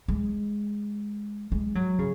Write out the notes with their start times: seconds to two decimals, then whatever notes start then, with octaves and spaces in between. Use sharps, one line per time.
0.08 G#3
1.52 G#3
1.75 F#3
1.99 C#3